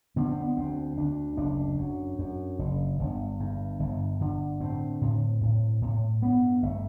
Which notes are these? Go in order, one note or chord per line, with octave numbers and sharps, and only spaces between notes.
D3 B3
C4
B3
D2 C4
D2 D4
F#1 D4
F#2
F#2
F#1
G1
G2
G1
D3
A2 C4
A2
A2
A2
G2 B3
G1 A3